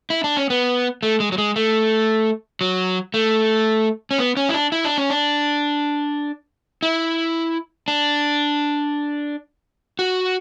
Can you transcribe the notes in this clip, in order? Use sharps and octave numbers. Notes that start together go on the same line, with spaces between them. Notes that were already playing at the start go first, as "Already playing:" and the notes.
E4
D4
C#4
B3
A3
G#3
F#3
G#3
A3
F#3
A3
C#4
B3
C#4
E4
D4
E4
D4
C#4
D4
E4
D4
F#4